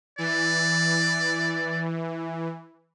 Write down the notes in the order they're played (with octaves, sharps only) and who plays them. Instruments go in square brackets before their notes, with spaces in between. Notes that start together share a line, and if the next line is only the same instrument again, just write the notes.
[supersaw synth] E3 [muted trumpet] D5